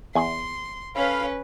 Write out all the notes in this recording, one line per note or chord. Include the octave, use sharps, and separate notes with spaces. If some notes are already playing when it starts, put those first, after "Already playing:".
E2 G#5 C6
C#4 A4 B4 C#5 F5 B5